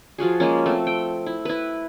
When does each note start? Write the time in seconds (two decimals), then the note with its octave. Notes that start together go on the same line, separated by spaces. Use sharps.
0.18 F3 F4 F#4 G#4
0.40 F3 G#3 A#3 C#4
0.66 A3 C4
0.87 G5
1.26 E4
1.45 E4 B4